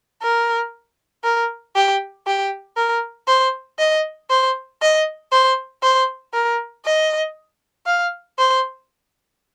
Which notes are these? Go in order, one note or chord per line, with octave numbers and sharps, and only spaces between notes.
A#4
A#4
G4
G4
A#4
C5
D#5
C5
D#5
C5
C5
A#4
D#5
F5
C5